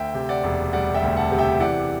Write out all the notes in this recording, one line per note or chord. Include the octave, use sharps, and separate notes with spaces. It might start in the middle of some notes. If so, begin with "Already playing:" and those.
Already playing: D2 E5 G5
C3
D5 F#5
E1
G3 D5 F#5
E5 G5
D2
F#5 A5
C3
E5 G5
E3 D5 F#5